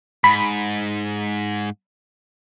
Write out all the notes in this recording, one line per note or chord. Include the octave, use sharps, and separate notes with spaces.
G#2 B5